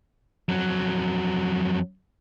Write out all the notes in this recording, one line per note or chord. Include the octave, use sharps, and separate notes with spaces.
F2 F#3